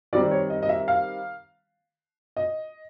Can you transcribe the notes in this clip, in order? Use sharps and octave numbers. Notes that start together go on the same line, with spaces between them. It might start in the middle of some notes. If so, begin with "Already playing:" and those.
D#3 G3 C4 D5
C#5
D#5
D#5
E5
F5
D#5